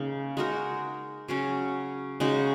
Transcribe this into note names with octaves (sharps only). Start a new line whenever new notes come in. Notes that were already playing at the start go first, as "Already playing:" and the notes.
Already playing: C#3 A#3 D#4
G#3 D#4 F#4 A#4
C#3 F#3 C#4
C#3 G#3 D#4 F#4